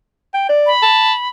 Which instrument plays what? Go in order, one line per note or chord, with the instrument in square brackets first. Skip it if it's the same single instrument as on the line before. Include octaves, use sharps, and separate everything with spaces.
[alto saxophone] G5
D5
[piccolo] B5
[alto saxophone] A5